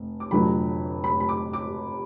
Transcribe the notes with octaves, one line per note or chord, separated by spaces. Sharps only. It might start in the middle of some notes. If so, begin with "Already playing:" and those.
Already playing: F1
D6
F1 F2 D3 F#3 B5
B5
B5
D6
D6